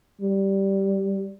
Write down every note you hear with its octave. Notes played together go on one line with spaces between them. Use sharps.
G3